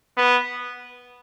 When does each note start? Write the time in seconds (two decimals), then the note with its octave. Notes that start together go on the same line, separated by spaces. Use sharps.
0.17 B3